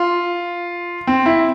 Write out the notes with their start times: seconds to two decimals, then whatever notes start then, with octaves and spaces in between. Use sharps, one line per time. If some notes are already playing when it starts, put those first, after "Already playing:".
Already playing: F4
1.07 C4
1.26 E4